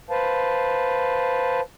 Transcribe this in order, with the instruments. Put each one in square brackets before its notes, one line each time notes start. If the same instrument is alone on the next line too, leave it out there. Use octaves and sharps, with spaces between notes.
[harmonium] B4 C5 F5 A5